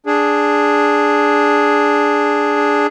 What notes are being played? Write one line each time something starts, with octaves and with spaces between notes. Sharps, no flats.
D4 G#4